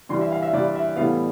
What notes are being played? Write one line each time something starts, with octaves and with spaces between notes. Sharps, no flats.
G2 E3 G3 C6
E5
F5
E5
G2 E3 G3 D5
E5
A2 E3 G3 B3 F5